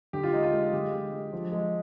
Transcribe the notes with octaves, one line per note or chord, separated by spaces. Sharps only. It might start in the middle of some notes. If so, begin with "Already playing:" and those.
D3 G4
F4
G#3 D#4
F4
G#3
D3 G4
G#3
G#3
F3
G#3